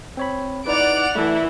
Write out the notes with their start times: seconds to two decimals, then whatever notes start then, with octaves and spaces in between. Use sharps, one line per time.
0.17 C4 C#5 B5
0.66 D#4 E4 B4 D5 F#5 D7 F7
1.15 E3 A3 E4 A5